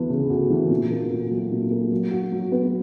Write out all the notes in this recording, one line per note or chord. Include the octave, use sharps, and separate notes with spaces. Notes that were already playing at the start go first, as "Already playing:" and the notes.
Already playing: D2 E3 B3
C#3
D2
E3
A#2
A#3
A#2
F#3
A#2
A#3
F#3
F#4
F#3
B3